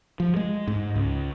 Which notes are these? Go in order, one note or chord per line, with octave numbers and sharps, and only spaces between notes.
F3
G#3
G#2
C#2